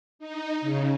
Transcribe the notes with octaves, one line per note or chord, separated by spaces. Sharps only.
D#4
C#3